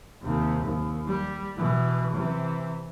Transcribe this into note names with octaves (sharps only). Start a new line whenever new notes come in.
D#2 C3
D#2
G3
B2 E3
C3 E3